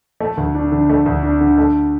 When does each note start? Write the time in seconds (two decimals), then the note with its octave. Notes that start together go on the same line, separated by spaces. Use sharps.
0.20 A3
0.37 D2
0.55 D4
0.72 D3
0.90 A3
1.06 D2
1.23 D4
1.41 D3
1.58 A3